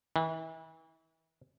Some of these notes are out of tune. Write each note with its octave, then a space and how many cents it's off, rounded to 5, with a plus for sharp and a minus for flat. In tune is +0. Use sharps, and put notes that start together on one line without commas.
E3 -35